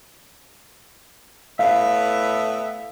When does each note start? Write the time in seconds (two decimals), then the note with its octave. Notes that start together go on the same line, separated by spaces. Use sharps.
1.59 A2 B3 E5 F5